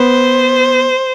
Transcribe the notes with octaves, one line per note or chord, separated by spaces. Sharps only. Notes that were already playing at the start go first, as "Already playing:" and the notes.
Already playing: B3 C5